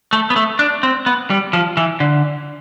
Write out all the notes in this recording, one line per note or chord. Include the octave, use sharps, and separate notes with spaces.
A3
B3
A3
D4
C4
B3
G3
F3
E3
D3